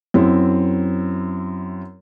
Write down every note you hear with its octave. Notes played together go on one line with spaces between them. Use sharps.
F#2 C4 E4